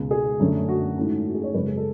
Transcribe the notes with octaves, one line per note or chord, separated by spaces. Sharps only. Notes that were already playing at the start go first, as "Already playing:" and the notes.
Already playing: C#2 B2 G#3 C#4
G#4
F#2 D3 A3 C#4
F#4
G#2 E3 A3 C#4
F#4
G#4
C#5
F#2 C#3 G#3 B4
G#4
A4